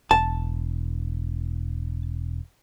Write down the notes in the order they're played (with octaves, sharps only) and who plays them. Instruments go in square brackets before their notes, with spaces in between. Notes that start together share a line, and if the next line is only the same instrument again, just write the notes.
[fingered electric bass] E1 [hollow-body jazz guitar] A5